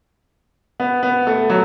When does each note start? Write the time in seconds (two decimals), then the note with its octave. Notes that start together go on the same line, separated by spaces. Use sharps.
0.80 B3
1.03 B3
1.27 A3
1.50 F#3